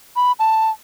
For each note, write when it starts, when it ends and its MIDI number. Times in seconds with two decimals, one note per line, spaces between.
0.16 0.32 83
0.39 0.70 81